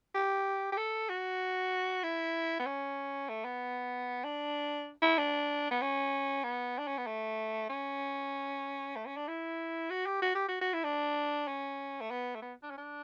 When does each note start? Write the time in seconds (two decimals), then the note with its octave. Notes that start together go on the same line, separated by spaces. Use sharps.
0.15 G4
0.73 G4
0.77 A4
1.09 F#4
2.03 E4
2.60 B3
2.66 C#4
3.29 A3
3.45 B3
4.24 D4
5.02 E4
5.18 D4
5.71 B3
5.82 C#4
6.44 B3
6.79 D4
6.88 C#4
6.98 B3
7.07 A3
7.70 C#4
8.96 A3
9.06 C#4
9.17 D4
9.28 E4
9.90 F#4
10.06 G4
10.22 F#4
10.35 G4
10.48 F#4
10.62 F#4
10.74 E4
10.84 D4
11.48 C#4
12.01 A3
12.11 B3
12.35 A3
12.42 B3
12.63 D4
12.71 C#4
12.78 D4